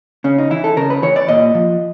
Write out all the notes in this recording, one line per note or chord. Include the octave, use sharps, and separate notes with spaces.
C#3 C#4
D#4
E3 E4
A4
C#3 A#4
B4
E3 C#5
D5
A#2 D#5
F3